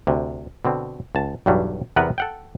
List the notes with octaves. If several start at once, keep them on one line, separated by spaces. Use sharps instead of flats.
D2 C3
B2 D3 C4
C#2 A5
B1 E2 G2 F#3 G3
E2 C3 B3 A#4 B4 F#5
A4 F#5 G5